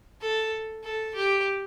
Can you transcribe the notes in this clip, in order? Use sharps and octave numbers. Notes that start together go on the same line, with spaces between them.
A4
A4
G4